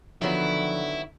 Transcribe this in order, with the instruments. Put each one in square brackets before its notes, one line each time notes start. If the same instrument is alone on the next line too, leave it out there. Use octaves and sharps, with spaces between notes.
[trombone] D3 [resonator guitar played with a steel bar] D#3 F#3 B3 [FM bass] F3 [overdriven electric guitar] E4